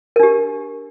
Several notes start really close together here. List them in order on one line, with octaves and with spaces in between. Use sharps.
A#4 D4 G4